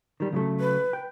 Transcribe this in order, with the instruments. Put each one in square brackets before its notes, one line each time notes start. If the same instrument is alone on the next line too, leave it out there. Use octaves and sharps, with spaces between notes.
[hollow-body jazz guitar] D#3 G3
C#3 F#3 A3
[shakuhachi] B4
[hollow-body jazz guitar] G5